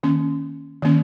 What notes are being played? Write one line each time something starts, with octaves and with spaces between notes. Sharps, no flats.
D#3 A#3 C#4
D#3 A#3 C#4